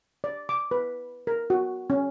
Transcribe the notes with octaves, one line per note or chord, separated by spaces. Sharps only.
D5
D6
B4
A#4
F#4
C#4